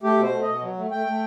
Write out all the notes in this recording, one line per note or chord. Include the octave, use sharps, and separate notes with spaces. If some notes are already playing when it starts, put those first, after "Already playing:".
A3 G4
B2
C5
A3
B2 D#5
F#3
A3
A3 G5
A3